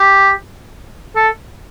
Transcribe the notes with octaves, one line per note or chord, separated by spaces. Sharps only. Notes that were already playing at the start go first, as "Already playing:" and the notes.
Already playing: G4
A4